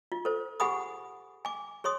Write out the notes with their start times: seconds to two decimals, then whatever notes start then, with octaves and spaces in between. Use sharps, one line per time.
0.12 F4
0.25 A4 C5
0.60 G4 G#4 F#5 G#5 B5 D#6
1.45 G#5 D6
1.84 G#4 C#5 C6 D#6